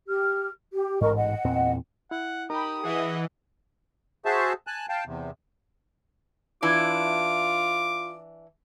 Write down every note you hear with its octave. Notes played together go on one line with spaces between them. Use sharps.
G4 F6
G4
A1 G#2 A#4 D#5 C#6
D#5 F#5
E2 A#2 C4
E4 F#5
D#4 G4 A#4 A#5 B5 D#6
E3 G#4 D#5 E5 F#5
F#4 G#4 C5 E5 A5
G#5 A5 F#6
F5 G5 A5
E2 C3
E3 D4 F4 D6